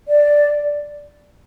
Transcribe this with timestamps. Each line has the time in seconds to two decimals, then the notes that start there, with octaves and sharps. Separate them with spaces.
0.08 D5